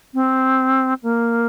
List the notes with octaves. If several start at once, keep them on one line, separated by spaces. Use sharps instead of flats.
C4
A#3